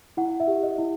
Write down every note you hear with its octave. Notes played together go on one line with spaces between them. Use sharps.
E4 F#5
E5
G4
D#5
E4